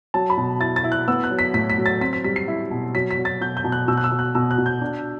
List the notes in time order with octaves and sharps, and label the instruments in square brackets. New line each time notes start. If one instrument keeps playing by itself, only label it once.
[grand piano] F#3 A5
B5
B2
E4 A6
A6
E4
F#6
B3 E6
F#6
F#3
B6
A2 B6
B6
F#3
A6
C4 B6
B6
G3 B6
C7
E4
B2
F#3 B6
B6
F#3
A6
B2 G6
G6
B2
F#6
B2 E6
F#6
E6
B2
F#6
B2 E6
F#6
B2
G6
D4